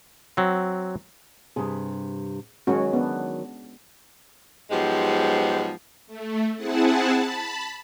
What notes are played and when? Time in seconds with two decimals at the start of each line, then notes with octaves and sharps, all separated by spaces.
0.37 F#3 C4
1.56 G2 C3 G#4
2.67 D#3 F#3 G#3 C#4 F#4
2.93 B3 D4
4.70 G#2 F3 F#3 G#3 B3 G4
6.07 A3
6.56 C4 E4 G#4 F#5 A5
7.11 A5 B5